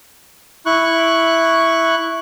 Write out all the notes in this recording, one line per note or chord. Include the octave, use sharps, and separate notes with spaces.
E4 C#6 F#6